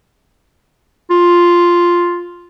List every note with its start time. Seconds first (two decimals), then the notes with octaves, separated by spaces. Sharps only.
1.11 F4